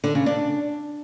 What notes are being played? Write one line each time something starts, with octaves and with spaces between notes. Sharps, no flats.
D3
C#3
D4